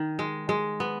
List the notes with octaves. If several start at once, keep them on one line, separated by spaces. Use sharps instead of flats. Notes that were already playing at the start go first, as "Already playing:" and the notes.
Already playing: D#3
G#3
G#3
B3